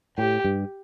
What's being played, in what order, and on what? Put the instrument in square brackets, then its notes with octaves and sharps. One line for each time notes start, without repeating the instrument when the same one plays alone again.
[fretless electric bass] A2 [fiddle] G4
[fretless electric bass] G2